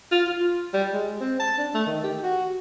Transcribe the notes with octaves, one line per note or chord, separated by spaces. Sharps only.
F4
F4
G3
G#3
C4
A5
D4
A3
D#3
G4
F#4